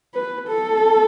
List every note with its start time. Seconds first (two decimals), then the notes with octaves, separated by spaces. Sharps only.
0.14 B4
0.48 A4